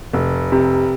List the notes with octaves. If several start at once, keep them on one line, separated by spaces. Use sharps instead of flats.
F1
C3